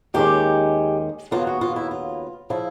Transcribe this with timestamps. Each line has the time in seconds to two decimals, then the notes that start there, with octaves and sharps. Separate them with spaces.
0.14 D#2 D#3 G#3 C#4 G4
1.31 D#2 C#3 F#3 B3 F4
1.47 F#4
1.61 F4
1.76 E4
1.91 F4
2.50 C#3 F3 E4